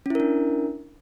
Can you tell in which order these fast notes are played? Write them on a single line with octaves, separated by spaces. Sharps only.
C#4 E4 A#4 D4